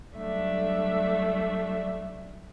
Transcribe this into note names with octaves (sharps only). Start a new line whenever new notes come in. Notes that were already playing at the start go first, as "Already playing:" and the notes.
F#3 G3 A3 D4 E5